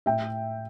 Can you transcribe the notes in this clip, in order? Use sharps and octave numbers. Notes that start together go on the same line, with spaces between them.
A2 E5 G5